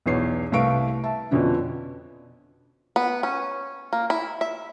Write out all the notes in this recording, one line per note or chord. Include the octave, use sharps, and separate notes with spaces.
B1 E2 C#5 C7
C2 A3 B4 F5 C#6 D7
E5 A5
F2 B2 D3 C#4 D4
B3
C#4
A#3
E4
E5